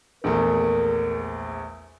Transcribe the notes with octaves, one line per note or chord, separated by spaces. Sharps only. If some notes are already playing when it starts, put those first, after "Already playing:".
A#1 E2 A3 A#4